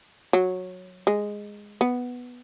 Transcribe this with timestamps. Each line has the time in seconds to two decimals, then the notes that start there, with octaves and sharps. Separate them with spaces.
0.33 F#3
1.07 G#3
1.81 B3